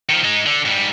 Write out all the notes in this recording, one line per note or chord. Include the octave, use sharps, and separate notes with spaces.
D#3 F3
G#3 D#4
D3
G#2 G3